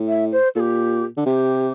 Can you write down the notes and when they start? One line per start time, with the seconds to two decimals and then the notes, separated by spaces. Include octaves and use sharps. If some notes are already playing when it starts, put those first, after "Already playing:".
Already playing: A2
0.08 E5
0.32 C5
0.55 A#2 G4 A4
1.17 D3
1.26 C3 G4